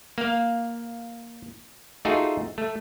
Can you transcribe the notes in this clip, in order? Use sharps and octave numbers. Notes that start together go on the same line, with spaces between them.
A#3 F5
A3 D#4 F4 F#4 G#4
A3